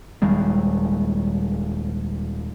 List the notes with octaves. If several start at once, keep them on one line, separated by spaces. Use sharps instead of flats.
D#1 D#3 G3 G#3